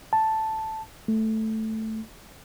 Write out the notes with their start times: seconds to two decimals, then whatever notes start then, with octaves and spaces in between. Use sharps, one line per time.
0.13 A5
1.08 A3